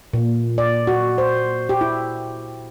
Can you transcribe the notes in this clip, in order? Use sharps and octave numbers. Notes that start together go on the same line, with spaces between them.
A#2
D5
F#4
C5
G4
E4